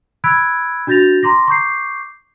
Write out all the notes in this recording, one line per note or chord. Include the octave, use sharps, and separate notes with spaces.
B5 E6 F#6 G#6 B6 D7
D4 F#4 G6 A6 A#6 F7
A#5 C6 D6 A#6
C#6 D6 G6 C7